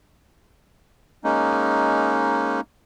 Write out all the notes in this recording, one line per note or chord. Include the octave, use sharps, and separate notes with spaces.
G#3 A#3 C#4 D#4